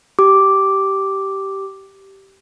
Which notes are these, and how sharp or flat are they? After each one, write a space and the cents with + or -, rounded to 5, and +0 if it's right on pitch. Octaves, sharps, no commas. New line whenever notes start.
G4 -15 D6 +0